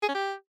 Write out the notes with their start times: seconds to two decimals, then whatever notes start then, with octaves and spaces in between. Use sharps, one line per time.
0.03 G#4
0.09 C#4
0.15 G4